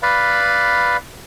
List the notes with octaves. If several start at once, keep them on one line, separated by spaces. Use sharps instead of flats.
B4 D5 F5 B5